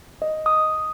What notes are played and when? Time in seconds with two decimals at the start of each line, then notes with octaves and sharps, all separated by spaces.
0.22 D#5
0.46 D#6